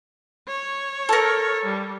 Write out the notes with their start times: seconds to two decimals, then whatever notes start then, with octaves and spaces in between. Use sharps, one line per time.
0.48 C#5
1.09 A4 A#4
1.64 G3